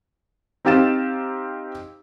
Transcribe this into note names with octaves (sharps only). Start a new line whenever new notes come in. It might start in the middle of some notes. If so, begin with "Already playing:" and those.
C4 D#4 G4 F5 A6 E7